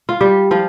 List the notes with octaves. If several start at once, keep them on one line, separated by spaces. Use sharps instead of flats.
F4
G3 G4
F3 F4